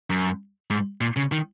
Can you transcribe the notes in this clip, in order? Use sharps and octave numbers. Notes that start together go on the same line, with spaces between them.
F#2
G#2
A#2
C#3
D#3